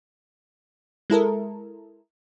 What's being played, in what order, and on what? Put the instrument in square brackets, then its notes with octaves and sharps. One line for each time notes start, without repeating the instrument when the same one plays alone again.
[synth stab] G#3 E4 A4 A#4